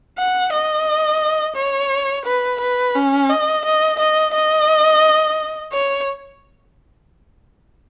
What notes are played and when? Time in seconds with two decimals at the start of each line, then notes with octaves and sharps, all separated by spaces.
0.18 F#5
0.52 D#5
1.56 C#5
2.25 B4
2.61 B4
2.95 C#4
3.30 D#5
3.65 D#5
3.99 D#5
4.34 D#5
5.72 C#5